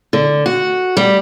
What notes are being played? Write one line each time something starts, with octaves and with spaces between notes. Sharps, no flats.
D3
F#4
G3